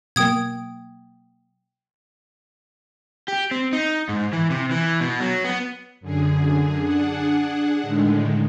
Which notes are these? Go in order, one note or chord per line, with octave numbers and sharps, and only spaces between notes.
B2 F#3 A#3 G5 D#6 G#6
G4
C4
D#4
G#2
E3
C3
E3
B2
F#3
B3
F#2 D3 G#4
D4 G#4 F#5
A2 D3 D#3 G#3